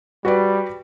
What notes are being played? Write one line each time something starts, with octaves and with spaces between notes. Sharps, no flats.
G3 F#4 B4 D5